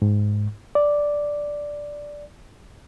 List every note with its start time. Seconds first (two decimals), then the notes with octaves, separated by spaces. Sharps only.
0.02 G#2
0.75 D5